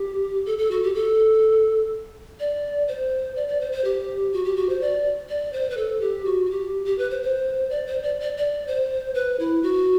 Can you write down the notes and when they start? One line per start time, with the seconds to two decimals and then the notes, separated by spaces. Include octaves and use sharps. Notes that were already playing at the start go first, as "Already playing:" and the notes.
Already playing: G4
0.46 A4
0.58 A4
0.71 F#4
0.83 G4
0.94 A4
2.40 D5
2.88 C5
3.36 D5
3.48 D5
3.61 C5
3.72 C5
3.85 G4
4.33 F#4
4.45 G4
4.56 F#4
4.69 C5
4.81 D5
5.29 D5
5.53 C5
5.70 B4
5.77 A4
6.01 G4
6.25 F#4
6.46 F#4
6.50 G4
6.86 G4
6.98 B4
7.11 C5
7.23 C5
7.70 D5
7.87 C5
8.03 D5
8.20 D5
8.37 D5
8.68 C5
9.15 B4
9.40 E4
9.63 F#4